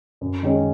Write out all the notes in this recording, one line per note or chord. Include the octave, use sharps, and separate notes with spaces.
F#2
D#3 G#3 C#4